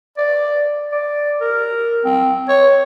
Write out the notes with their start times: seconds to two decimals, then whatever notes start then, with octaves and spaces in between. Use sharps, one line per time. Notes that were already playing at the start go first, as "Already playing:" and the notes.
0.18 D5
0.92 D5
1.41 A#4
2.05 C4
2.49 C#5